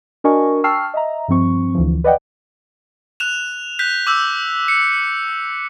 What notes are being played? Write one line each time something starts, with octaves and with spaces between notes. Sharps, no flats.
D4 F#4 A#4 D#5 G#5 C#6
G5 A5 C#6 E6 F6 C7
D#5 E5 A#5
G2 F3 C4 C#6
D2 E3 F3
B4 D5 D#5 F#5 G5
F#6 E7 F7
F#6 G6 B6
D6 E6 G6
C#7